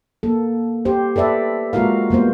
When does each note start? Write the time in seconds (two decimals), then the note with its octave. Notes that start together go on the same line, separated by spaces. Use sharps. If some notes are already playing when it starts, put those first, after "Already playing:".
0.23 A#3 A4
0.85 G4 C5
1.16 A4 B4 D5 E5
1.73 G#3 A#3 F4 F#4 A#4 F5
2.10 G3 A#3 B3 C5